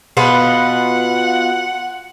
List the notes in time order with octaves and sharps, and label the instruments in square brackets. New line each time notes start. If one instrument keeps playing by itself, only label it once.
[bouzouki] B2 F4 B4 [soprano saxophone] F#5